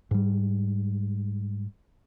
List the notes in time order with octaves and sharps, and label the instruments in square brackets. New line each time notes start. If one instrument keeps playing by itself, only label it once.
[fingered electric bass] G#2 G3